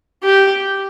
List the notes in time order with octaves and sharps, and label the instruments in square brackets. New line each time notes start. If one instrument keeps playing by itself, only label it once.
[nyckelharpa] G4